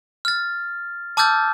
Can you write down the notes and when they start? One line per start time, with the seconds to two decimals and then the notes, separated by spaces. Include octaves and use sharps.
0.25 F6 A6
1.17 A5 D6 E6 F6 G6 A6